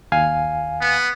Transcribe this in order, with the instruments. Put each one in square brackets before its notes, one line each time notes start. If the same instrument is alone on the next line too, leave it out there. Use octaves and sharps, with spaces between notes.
[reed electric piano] D#2 F5 G#5
[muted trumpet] B3